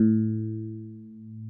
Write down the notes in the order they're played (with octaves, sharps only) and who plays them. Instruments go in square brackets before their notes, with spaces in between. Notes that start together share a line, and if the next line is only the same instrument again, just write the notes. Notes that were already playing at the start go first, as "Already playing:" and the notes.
Already playing: [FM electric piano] A2